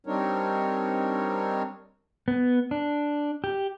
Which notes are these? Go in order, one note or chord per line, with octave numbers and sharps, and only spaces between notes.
G3 C4 D4 D#4 A#4 C#5
B3
D4
G4